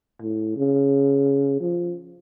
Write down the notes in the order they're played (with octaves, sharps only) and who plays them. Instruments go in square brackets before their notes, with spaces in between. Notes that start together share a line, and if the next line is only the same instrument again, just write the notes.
[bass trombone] A2
C#3
F3